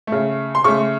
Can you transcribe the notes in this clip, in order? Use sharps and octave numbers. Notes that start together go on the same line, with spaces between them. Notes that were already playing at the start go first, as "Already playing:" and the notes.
C#3 A3
C6
C#3 A3 C#6